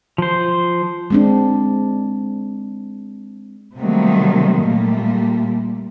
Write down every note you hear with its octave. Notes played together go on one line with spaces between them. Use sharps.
F3 C5
G#3 C4 D4
C3 D#3 F#3 G3 A3 A#3
A#2 G3 A3 A#3